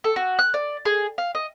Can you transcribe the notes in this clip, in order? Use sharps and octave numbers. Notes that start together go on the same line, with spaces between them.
A4
F#4
F#6
D5
G#4
F5
D#5